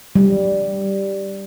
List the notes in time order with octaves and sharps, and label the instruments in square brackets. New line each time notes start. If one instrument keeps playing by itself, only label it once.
[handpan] G3